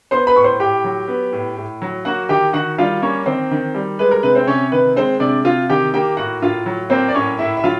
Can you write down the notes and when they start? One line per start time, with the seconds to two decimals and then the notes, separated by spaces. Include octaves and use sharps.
0.11 B3 C5 C6
0.27 B4 B5
0.36 A2 C#6
0.44 C5 C6
0.60 A2 G4 G5
0.84 F#3
1.08 B3
1.32 A2
1.57 A2
1.82 F#3
2.05 A#3 F#4 F#5
2.29 D#3 G4 G5
2.53 D#3 F#4 F#5
2.78 G3 F4 F5
3.02 A#3 C#4 C#5
3.26 D#3 C4 C5
3.51 D#3
3.75 G3
3.99 G#3 B4
4.11 A#4
4.23 C3 B4
4.35 C4 C5
4.47 C3 C#4 C#5
4.72 D#3 B4
4.96 G#3 C4 C5
5.20 C3 D4 D5
5.44 C3 F4 F5
5.70 D#3 G4 G5
5.94 A#3 G4 G5
6.17 A2 F#4 F#5
6.42 A2 F4 F5
6.66 F#3
6.90 A#3 C4 C5
7.09 D5
7.15 A2 C#4 C#5
7.39 A2 E4 E5
7.57 E5
7.64 F#3 F4 F5